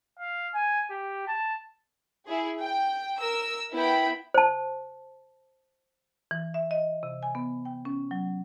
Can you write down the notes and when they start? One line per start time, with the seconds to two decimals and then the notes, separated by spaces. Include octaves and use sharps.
0.19 F5
0.54 G#5
0.90 G4
1.27 A5
2.27 E4 G#4
2.62 G5
3.19 A#4 E6
3.73 B3 E4 G5 B5
4.34 C5 A5
6.31 E3
6.54 E5
6.71 D#5
7.03 C3
7.23 G#5
7.35 B3
7.65 G5
7.85 C#4
8.11 F#3